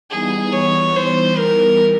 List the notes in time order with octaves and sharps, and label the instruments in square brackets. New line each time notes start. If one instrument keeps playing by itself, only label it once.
[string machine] E3 G3 B3 D#4 [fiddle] G#4
[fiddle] C#5
C5
A#4